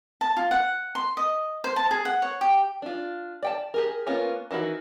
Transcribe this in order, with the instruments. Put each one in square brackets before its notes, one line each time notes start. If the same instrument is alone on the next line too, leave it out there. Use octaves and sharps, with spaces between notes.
[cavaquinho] A5
F4
F#5
C6
D#5
C5
A5
G#4
F#5
C#5
G4
[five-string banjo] D4 F4
D5 G5 A5
G4 G#4 A#4
A#3 B3 C#4 F4
D#3 E3 D#4 F#4